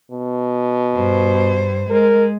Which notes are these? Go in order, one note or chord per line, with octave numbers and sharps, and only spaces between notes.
B2
G2 C5
G#3 A#4